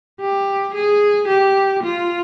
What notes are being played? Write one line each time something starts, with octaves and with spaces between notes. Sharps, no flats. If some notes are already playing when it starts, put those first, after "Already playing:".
G4
G#4
G4
F4